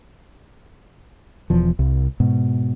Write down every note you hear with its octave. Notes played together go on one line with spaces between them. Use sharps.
E1 E2 F3
C2
G#2 B2